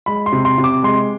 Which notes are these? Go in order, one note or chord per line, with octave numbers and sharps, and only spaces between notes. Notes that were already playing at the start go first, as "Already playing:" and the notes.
G#3 B5
C6
C3
C6
C3
D6
G#3 C6